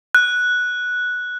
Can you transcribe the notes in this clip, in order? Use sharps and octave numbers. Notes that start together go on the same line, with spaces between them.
F#6